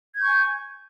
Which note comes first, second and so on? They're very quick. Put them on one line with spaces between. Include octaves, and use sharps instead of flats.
G#6 G6 C#6 G#5